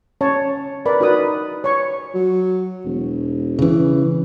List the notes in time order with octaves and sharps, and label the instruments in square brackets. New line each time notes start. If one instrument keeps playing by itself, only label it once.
[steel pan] C#4 C#5 A5
A#4 B4 D5 B5
D#4 F#4 A#4 B4 D#6
C#5 C#6
[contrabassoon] F#3
E1
[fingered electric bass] C#3 E3